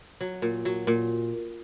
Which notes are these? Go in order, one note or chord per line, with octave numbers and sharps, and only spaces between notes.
F#3
A#2
F#3
A#2